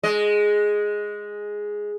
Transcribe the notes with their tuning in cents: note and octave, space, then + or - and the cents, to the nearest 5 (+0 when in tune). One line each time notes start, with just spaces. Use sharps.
G#3 +0 D#5 +0